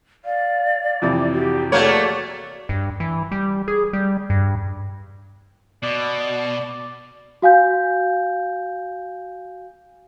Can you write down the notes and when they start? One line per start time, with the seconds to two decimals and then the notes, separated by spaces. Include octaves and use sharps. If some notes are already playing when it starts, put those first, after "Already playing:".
0.25 D5 F5
1.02 F2 C3 E3 D6
1.32 F#4 G4
1.72 A3 A#3 F#4 G#4 A4 C#5 D5
2.69 G2
3.00 E3
3.32 G3
3.68 G#4
3.93 G3
4.30 G2
5.83 B2 D5
7.42 F#4 F5 G#5 G6